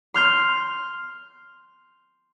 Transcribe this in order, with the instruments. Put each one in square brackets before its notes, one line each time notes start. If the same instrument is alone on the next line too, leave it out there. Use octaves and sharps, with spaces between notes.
[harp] C6 F6 G6